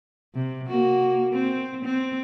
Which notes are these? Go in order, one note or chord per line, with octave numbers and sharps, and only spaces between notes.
C3
A#3 F#4
C4
C4